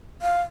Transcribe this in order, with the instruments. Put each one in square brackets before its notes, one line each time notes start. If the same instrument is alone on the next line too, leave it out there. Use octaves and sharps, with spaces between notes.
[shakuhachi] F5